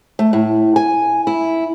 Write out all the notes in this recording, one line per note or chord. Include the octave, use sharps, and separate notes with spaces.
A3
A2
G#5
E4